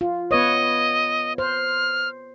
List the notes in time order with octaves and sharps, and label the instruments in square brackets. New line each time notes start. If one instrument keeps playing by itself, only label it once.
[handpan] F4
[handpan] B3 B4 C#5 [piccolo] D#5
[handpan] C5 [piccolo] F6